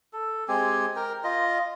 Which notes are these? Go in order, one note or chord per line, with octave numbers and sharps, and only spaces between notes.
A4
G#3 C4 G4 G#5
A#4 G5
F4 D#5